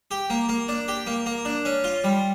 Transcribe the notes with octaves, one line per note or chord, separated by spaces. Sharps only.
G4
A#3
A#3
D4
G4
A#3
A#3
D4
C#4
F4
G3